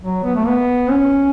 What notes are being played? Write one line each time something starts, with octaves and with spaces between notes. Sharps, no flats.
F#3
B3
A3
B3
C#4